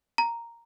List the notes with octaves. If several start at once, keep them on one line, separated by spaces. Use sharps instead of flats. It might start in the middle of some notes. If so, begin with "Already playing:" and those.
A#5